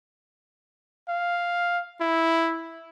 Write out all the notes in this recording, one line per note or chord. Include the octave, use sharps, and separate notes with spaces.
F5
E4